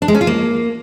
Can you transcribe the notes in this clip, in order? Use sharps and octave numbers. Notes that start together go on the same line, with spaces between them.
D4
G#3
C#4
F4
A#3